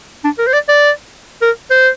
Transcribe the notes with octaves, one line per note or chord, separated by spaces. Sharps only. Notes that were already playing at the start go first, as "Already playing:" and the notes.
D4
A#4
C5
D5
D5
A#4
C5